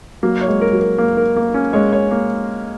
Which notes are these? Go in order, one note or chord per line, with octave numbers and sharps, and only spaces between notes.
F#3 A#3
C#5
G#3
A#4
F#3
A#4
A#3
A#4
A#3
C#4
G#3 C#5
C#5
A#3